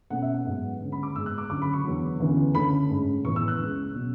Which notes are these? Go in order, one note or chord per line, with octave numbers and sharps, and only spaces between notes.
B2 A3 C#4 F#5
E5
F#5
G#2 F#3 B3
D2 C#3 G#3 C#4
B5
D6
G#2 G#3 B3 E6
F#6
D6
D2 C#3 F#3 D6
B5
C#6
E2 D3 F#3
D2 C#3 E3 B3
D2 D3 A3 C#4 B5
G#2 G#3 C#4
A2 E3 B3 C#6
E6
F#6
C#2 C#3 G#3 C#4
B2 F#3 C#4